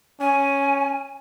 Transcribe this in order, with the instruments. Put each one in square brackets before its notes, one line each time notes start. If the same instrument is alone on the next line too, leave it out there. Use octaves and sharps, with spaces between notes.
[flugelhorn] C#4 [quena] G#5